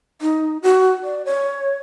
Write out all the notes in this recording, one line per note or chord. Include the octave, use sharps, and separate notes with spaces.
D#4
F#4
D5
C#5